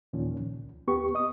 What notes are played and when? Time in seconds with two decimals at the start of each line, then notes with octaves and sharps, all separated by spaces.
0.13 D#2 A#2 D#3 F3 C#4
0.37 C#2
0.87 D#2 B3 G4 C#6
1.14 B3 D#5 D#6